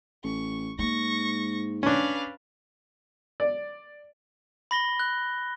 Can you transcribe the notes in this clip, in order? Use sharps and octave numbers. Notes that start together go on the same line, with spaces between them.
A1 C#6
G#2 G#3 A#3 C#6 A#6
C#4 D4 B4 F5
D5
B5 A#6 G7
F#6